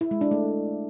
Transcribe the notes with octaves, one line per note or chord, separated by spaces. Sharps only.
E4
G#3
D4
A3